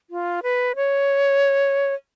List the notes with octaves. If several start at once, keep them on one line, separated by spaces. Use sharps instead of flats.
F4
B4
C#5